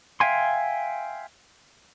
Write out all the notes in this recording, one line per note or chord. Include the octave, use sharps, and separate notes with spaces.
E5 F5 G5 G#5 C6